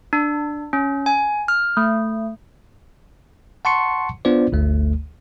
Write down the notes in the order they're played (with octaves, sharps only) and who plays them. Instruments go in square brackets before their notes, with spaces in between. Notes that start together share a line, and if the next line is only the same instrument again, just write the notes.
[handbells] D4
C#4
G#5
F6
A3
[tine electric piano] F#5 A5 C6 C#6 C#7
B3 D4 F4 C5 D5
G1 D2 A3